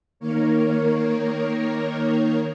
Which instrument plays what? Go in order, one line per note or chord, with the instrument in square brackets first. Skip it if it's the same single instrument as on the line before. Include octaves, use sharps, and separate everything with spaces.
[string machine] D#3 A#3 A#4 C#5